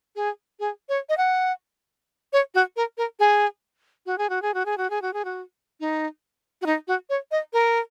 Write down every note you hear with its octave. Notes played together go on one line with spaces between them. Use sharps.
G#4
G#4
C#5
D#5
F#5
C#5
F#4
A#4
A#4
G#4
F#4
G#4
F#4
G#4
F#4
G#4
F#4
G#4
F#4
G#4
F#4
D#4
F#4
D#4
F#4
C#5
D#5
A#4